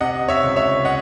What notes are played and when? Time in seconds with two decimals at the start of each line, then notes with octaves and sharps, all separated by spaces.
0.01 C3 D#5 F#5
0.28 C#5 E5
0.44 C#2
0.56 C#5 E5
0.85 D#5 F#5